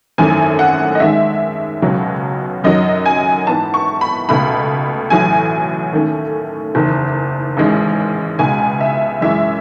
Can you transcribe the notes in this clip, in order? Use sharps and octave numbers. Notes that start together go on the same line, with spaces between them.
G#1 F#2 E3 A3 G#5
F#5
D#5
D#2 D#3 G#3 C#4 E5
C#2 B2 F#3 C#4
F#2 D#3 F#3 D#5
G#5
G#2 E3 B3 A5
C#6
B5
C#2 B2 A3 B5
A1 A2 F#3 G#5
D#2 D#3 A3 C#4
F#1 E2 D#3
A1 G#2 D#3 G#3 C#4
C#2 B2 G#3 G#5
E5
F#2 E3 G#3 C#4 E5